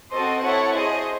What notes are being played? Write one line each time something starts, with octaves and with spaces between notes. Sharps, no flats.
C4 F#4 A4 C5 D#5
E4 A4 C#5 F#5
G#4 C5 D#5